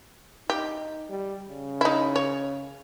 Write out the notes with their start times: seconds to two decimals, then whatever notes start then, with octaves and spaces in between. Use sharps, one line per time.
0.50 D#4 G4
1.10 G3
1.49 C#3
1.81 D#4 E4
2.16 C#5